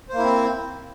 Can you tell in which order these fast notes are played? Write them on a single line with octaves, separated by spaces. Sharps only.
C5 A#3 E4 C4